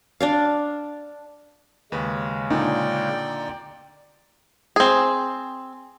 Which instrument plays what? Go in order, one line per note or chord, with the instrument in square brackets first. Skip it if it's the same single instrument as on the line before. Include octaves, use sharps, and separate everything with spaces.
[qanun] D4 D5 F5
[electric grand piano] D#2 B4 [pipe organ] C#3 G#3
[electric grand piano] A#2 F4 [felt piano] D3 D4 D#4 [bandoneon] D5 G5
[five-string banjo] C4 G#4